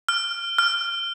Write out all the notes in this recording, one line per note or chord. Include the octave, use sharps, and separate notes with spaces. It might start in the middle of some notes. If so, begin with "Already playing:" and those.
F6
F6